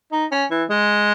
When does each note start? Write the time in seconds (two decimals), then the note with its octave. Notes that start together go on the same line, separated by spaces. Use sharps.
0.12 D#4
0.31 C#4
0.50 E3
0.70 G#3